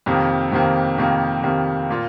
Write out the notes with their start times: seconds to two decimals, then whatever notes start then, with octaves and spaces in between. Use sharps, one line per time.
0.06 F2 C3 D#3 A#3
0.52 F2 C3 D#3 A#3
0.98 F2 C3 D#3 A#3
1.43 F2 C3 D#3 A#3
1.90 A#2 A#3 F4